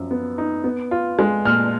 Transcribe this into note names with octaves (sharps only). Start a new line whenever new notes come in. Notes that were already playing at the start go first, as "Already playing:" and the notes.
Already playing: F#2 F3
B3
D#4
B3
F4
G#3
A#2 F6